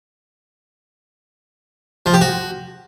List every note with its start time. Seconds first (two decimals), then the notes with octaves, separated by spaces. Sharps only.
2.06 F3
2.14 G4
2.21 F#4